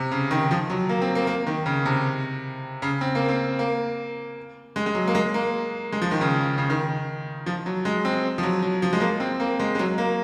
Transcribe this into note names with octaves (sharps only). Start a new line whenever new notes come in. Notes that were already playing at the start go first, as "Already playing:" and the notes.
Already playing: C3
C#3
D#3
F3
F#3
A#3
C4
A#3
A#3
D#3
C#3
C3
C#3
C4
A#3
C4
A#3
G#3
G#3
F#3
A#3
G#3
A#3
G#3
F3
D#3
C#3
C#3
D#3
F3
F#3
G#3
C4
F3
F#3
F#3
F3
G#3
A#3
C4
A#3
G#3
G#3
F#3
A#3